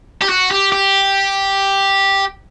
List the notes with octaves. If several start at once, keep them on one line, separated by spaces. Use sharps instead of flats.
G4
F#4
G4
G4